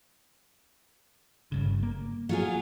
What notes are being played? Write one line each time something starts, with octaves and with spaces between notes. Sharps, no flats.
G1 G2 C#3
A#3
F#3 F4 G#4